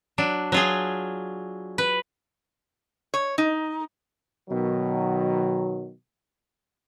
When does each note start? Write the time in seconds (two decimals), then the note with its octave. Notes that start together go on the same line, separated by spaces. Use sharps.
0.18 F#3 D4
0.52 F#3 F4 G#4
1.78 B4
3.14 C#5
3.38 D#4
4.50 B2 D#3 F#3